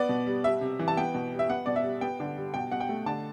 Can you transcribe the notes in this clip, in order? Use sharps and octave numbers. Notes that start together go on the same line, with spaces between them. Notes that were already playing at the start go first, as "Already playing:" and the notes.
Already playing: B3 D5
B2
G3
G3 E5
C3
E3
A5
B3 G5
B2
G3
E5
B3 F#5
B2 D5
E5
G3
B3 G5
D3
G3
B2 G5
B2 F#5
G5
A3
D3 A5